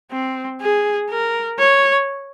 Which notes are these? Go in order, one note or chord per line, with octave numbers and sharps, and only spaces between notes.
C4
G#4
A#4
C#5